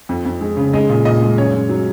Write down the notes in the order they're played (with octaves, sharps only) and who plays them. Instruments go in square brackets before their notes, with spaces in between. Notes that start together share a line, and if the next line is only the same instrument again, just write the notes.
[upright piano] F2
F2
G#3
C#3
G#3 D#5
A#2
A#2 D#5
G#3
F#2 C#5
F#2
F#3